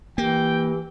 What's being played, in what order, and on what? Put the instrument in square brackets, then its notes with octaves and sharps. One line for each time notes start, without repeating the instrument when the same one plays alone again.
[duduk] E3 [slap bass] A#3 [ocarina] G4 [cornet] G5